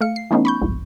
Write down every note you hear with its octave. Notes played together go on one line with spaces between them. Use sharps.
A3 F5 C#7
C7
E3 A3 B3 C#4 D#4
B5 C#6 G6
G1 C2 F2 G#2